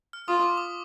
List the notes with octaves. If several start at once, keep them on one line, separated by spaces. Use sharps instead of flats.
F6
F4 D#6
D6
D#6